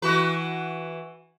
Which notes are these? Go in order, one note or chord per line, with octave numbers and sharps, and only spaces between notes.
E3 F#4 B4